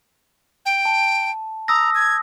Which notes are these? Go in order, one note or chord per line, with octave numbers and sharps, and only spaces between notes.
G5
A5
A#5 D#6 E6 A#6
G#6